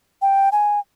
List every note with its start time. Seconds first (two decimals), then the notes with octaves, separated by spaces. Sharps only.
0.22 G5
0.52 G#5